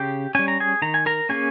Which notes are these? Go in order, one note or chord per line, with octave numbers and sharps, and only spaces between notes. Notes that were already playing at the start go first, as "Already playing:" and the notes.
Already playing: C#3 G4 G5
G3 C#4 G#5
A#5
G#4 G#5
D#3 A#5
G#5
A#4 A#5
A#3 C#4 G#4 G#5